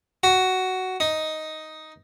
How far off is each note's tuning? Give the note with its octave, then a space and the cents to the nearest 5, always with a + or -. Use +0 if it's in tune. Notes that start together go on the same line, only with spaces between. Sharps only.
F#4 +10
D#4 +5